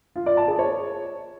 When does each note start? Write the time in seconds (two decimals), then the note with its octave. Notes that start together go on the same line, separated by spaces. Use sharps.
0.16 F4
0.26 D5
0.37 A5
0.48 G#4
0.59 C#5